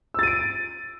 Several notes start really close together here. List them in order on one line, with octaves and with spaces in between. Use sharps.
E6 A6 D#7 D7